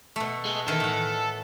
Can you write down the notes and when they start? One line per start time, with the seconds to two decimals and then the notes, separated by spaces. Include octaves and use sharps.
0.16 B2 A3
0.45 G#3
0.68 D#3 E3 A4
0.80 A2 F#5